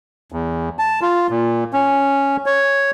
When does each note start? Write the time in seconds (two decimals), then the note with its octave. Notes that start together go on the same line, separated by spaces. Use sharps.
0.32 E2
0.79 A5
1.02 F4
1.30 A#2
1.73 C#4
2.46 C#5